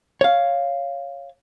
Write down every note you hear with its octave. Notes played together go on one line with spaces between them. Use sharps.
C#5 F5